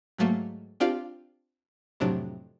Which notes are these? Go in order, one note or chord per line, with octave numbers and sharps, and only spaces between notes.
G#2 F#3 A3 A#3
C4 D4 F4 G4 D5 F5
F2 A2 C3 F#3 D4